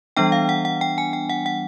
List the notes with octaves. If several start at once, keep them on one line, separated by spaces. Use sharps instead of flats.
E3 G3 B3 D4 G5
F5
F#5
F#5
G5
G#5
G5
F#5
F#5